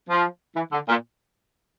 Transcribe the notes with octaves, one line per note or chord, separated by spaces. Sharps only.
F3
E3
D3
A#2